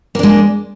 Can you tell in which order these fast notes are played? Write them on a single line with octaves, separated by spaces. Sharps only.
A#3 D4 G#3